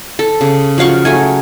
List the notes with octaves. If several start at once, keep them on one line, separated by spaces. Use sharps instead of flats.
A4
C#3
F3 F#3 F5 C#6
F#3 A3 G#5